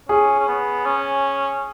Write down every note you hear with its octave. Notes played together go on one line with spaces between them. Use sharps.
C#4 G#4
C#4
B3
C#4